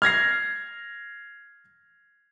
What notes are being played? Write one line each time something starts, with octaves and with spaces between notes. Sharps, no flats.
F6 G#6 A#6 C7